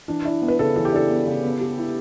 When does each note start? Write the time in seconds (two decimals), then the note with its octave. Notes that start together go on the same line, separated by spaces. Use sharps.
0.08 E3 D4
0.25 D4 E4
0.42 B3
0.48 B4
0.58 C#3 A4
0.76 E3 A4
0.85 G4
0.93 D4 A4
1.10 B3
1.26 C#3
1.43 B3
1.61 G4
1.78 E4